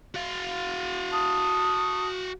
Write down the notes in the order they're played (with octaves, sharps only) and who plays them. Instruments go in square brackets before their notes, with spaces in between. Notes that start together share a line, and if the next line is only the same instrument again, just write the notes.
[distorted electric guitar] F#4 F5
[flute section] A5 D#6